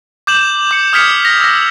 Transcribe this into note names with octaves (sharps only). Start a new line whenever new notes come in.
D6 G6 E7 F#7
D6 C#7
D#6 F6 G#6 B6 C#7 F7
A#6 F7
E6 A#6